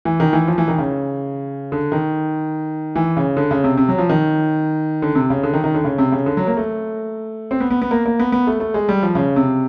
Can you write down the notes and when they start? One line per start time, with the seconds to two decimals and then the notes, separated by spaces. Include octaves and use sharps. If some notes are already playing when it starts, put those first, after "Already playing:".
0.05 E3
0.20 D#3
0.33 E3
0.48 F3
0.58 E3
0.68 D#3
0.78 C#3
1.72 D3
1.92 D#3
2.96 E3
3.17 C#3
3.37 D3
3.51 C#3
3.64 C3
3.77 C3
3.89 F#3
3.98 F3
4.09 D#3
5.02 D3
5.15 C3
5.30 C#3
5.43 D3
5.53 D#3
5.64 D#3
5.75 D3
5.85 C#3
5.98 C3
6.12 C#3
6.26 D3
6.37 F#3
6.47 A#3
6.57 A3
7.51 C4
7.60 B3
7.70 B3
7.82 B3
7.91 A#3
8.06 A#3
8.20 B3
8.32 B3
8.47 A3
8.60 A3
8.74 G#3
8.89 G3
9.02 F3
9.15 C#3
9.36 C3